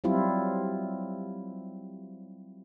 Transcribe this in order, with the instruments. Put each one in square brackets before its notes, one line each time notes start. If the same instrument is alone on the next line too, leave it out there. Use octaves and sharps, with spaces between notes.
[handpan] F#3 G3 C4 E4 F4